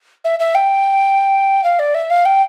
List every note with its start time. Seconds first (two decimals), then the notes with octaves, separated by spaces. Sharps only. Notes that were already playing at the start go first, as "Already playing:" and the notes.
0.24 E5
0.39 E5
0.55 G5
1.63 F5
1.79 D5
1.94 E5
2.10 F5
2.25 G5